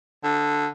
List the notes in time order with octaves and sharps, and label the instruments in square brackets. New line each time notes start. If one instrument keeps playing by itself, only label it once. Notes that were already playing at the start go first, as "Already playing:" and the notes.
[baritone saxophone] D3